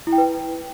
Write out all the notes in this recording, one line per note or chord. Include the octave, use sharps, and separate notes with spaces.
E4
G5
B4